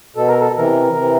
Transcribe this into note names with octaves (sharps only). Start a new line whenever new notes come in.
B2 A4
A#4
A4
C3 E3 A#4
C3 E3